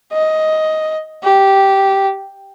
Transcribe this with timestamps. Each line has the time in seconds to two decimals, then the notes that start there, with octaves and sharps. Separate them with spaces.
0.13 D#5
1.23 G4